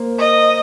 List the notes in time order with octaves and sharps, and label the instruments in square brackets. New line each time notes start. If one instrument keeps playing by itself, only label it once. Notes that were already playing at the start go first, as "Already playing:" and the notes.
Already playing: [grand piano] A#3 C5
[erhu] D#5